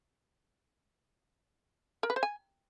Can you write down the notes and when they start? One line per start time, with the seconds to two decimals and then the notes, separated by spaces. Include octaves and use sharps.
2.03 A#4
2.10 B4
2.16 C5
2.23 G#5